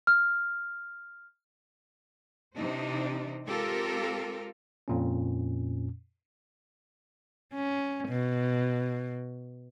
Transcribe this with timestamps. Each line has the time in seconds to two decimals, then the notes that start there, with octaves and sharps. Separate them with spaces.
0.07 F6
2.56 C3 E3 D4 D#4 C5
3.46 G#3 C4 F4 G4 A4 A#4
4.88 F2 A#2 C#4
7.53 C#4
8.08 B2